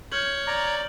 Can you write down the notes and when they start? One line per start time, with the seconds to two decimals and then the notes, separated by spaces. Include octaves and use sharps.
0.12 C#5 F6 G6 F#7
0.47 D5 A#5